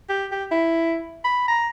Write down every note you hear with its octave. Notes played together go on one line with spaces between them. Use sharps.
G4
G4
E4
B5
A#5